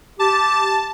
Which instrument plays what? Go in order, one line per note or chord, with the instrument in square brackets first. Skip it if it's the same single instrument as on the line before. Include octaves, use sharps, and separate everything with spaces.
[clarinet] G4 [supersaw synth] A5